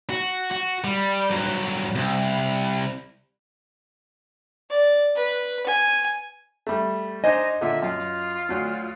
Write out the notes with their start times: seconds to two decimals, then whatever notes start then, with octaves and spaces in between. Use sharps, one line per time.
0.10 F#4
0.51 F#4
0.84 G3
1.30 G2 F#3
1.95 C2
4.70 D5
5.16 B4
5.67 G#5
6.67 G3 A3
7.24 D4 D#4 C5 D#5 G#5
7.61 A#2 D3 E5
7.82 F#2 F4
8.49 D2 F#3